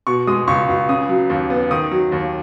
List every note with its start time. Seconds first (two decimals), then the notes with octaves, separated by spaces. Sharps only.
0.07 B2 C#6
0.27 G#3 D#6
0.48 C#2 C#6
0.69 C#2
0.89 C#3 D#6
1.09 F#3
1.30 D#2
1.50 B3
1.71 D#3 D#6
1.91 F#3
2.12 D#2